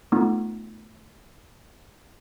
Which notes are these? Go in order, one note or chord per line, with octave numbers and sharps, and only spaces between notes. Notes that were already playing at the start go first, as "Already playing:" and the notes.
A3 B3 D#4 F4